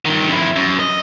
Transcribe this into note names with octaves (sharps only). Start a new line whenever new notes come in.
G2 D#3
F2 E4
F#2
D#5